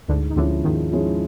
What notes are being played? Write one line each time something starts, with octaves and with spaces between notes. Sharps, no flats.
D2 G#2 D3
D#3
D2 D3 F3 G#3 C#4 E4
D#2 G#2 D#3
F3 G#3 C#4 E4